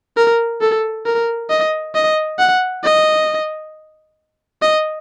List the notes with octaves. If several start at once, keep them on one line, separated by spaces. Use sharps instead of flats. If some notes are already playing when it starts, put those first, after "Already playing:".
A#4
A4
A#4
D#5
D#5
F#5
D#5
D#5